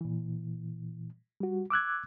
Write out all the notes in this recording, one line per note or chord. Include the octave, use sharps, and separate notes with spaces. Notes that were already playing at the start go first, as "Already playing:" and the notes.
A#2 E3
G3 F#4
D6 E6 F#6 G#6